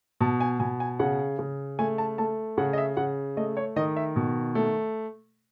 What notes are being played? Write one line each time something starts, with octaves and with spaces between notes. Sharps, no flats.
B2 A5
G#5
B2 G#5
G#5
C#3 F#5
C#3
A3 G#5
A5
A3 A5
C#3 F#5
D#5
E5
C#3 F#5
A3 D#5
C#5
D#3 D#5
E5
B2
A3